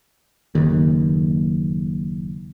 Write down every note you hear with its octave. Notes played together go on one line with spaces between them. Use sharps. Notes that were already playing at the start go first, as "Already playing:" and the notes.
F#1 D#2